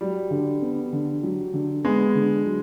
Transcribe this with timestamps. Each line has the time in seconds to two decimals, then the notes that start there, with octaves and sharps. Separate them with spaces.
0.01 F#3 G3
0.31 D3
0.62 B3
0.93 D3
1.23 F#3
1.54 D3
1.84 G#3 B3
2.15 D3
2.46 F#3